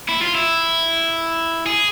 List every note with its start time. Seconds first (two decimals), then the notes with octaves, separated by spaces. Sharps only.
0.09 E4
0.22 F4
0.35 E4
1.66 G#4